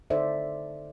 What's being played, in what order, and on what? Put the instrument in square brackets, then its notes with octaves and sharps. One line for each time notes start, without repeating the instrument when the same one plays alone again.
[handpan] D3 D#4 A4 C5 D5 E5